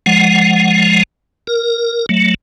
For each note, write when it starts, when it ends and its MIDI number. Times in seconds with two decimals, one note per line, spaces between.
0.06 1.03 53
0.06 1.03 56
0.06 1.03 78
1.47 2.06 70
2.09 2.34 54
2.09 2.34 57